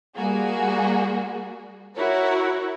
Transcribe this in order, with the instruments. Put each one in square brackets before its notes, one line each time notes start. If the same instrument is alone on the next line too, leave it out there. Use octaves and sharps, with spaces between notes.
[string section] G3 A#3 F#4 G#4
E4 F#4 A#4 C#5